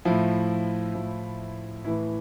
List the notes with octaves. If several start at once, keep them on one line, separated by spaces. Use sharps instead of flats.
A2 F3 E4
A2 F3
A2 E3 E4